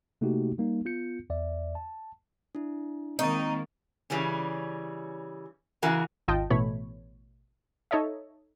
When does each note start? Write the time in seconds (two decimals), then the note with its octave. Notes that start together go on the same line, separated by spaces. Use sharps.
0.21 C3 A3 A#3 D#4 F#4 G4
0.58 G3 A#3 D#4
0.85 B3 F4 G6 C#7
1.30 E2 D5 E5
1.75 A5
2.55 D4 E4
3.19 D#3 G#3 A#3 C4 D#4 C#6 A6
4.10 C#3 E3 G3 C#4
5.82 C#3 E3 F#4 A#4
6.28 G#1 D#2 F4 D#5 G5 A5
6.50 A1 B2 E3 A3 C#5 B5
7.91 D#4 A4 C#5 D#5 E5